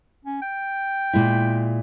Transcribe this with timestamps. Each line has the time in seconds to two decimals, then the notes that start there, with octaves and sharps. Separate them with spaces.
0.25 C#4
0.42 G5
1.13 A#2 G#3 E4